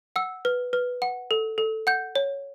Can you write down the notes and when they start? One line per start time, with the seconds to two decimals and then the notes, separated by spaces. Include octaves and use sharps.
0.16 F#5 E6
0.45 B4
0.73 B4
1.02 F#5
1.31 A4
1.58 A4
1.87 F#5 G6
2.16 C#5